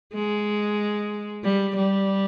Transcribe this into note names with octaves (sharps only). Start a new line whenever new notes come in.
G#3
G3
G3